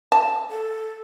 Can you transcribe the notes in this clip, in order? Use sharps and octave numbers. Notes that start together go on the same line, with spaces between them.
A5
A4